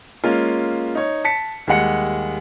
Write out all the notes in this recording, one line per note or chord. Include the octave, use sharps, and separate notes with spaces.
G#3 A#3 C#4 F4
D#4 C#5
A5 B6 C#7
D#2 G3 G#3 F#5 C#7